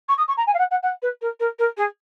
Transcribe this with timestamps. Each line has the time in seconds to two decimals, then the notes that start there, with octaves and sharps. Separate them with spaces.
0.09 C#6
0.18 D#6
0.28 C#6
0.37 A#5
0.47 G#5
0.54 F5
0.58 F#5
0.71 F#5
0.83 F#5
1.02 B4
1.21 A#4
1.40 A#4
1.59 A#4
1.77 G#4